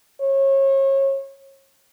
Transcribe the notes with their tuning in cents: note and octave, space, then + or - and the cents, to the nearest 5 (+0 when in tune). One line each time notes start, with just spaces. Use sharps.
C#5 -30